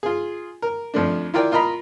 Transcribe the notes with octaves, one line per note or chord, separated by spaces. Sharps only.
F4 G#4
A#4
F2 F3 A3 D4
E4 F4 A#4 D5 G5
F4 A#4 D#5 A#5 B5